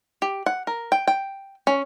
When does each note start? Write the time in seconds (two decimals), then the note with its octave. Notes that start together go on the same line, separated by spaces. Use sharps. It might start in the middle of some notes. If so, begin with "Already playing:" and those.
0.22 G4
0.46 F#5
0.67 A#4
0.92 G5
1.08 G5
1.67 C#4